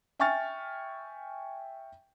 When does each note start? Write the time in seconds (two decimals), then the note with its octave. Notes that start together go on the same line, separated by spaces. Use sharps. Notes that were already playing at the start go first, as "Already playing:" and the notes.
0.20 E5 G5 G#5 C#6 F6 A6